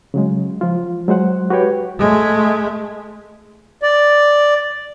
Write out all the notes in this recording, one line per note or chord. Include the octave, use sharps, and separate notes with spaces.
C#3 F#3 G#3
F3 F4
F#3 G#3 C5 F#5
F#4 G4 B4 C#5 G5
G#3 A3
D5